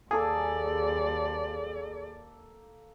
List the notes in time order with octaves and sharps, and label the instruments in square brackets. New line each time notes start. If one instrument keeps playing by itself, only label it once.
[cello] D#2 D5 [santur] A#3 A4 E6 [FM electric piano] G#4